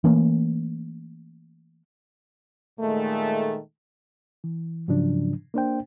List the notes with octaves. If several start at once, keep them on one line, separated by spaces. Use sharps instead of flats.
E3 A3 A#3 C#4
A#2 D#3 G#3 A3
E3
G#2 C#3 F3 F#3 D4
A#3 D4 C5 G5